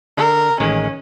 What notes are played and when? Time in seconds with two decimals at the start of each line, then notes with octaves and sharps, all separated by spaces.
0.17 D3 A#4
0.60 A1 D#3 G#3 C#4